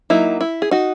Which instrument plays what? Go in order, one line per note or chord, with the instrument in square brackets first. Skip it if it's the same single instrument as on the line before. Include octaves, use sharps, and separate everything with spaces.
[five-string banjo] F#3 A#3 D#4 E4
E4
G#4
D#4 F#4